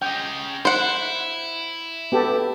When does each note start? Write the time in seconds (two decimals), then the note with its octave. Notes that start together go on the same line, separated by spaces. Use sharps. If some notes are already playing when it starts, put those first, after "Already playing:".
0.02 C#4 D#5 G5
0.65 E4 C5 F#5
2.12 B3 G4 A4